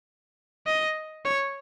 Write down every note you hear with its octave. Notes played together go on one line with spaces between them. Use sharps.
D#5
C#5